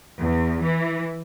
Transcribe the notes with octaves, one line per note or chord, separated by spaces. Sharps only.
E2
E3